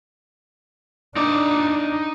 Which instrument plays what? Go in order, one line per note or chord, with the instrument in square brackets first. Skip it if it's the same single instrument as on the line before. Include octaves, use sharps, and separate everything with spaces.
[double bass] D4 [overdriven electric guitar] D#4 D5